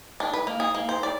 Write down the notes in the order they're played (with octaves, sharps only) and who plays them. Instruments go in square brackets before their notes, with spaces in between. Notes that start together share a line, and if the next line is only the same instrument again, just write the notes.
[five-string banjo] D4
B4
A#3
G#4
A#3
C5
D5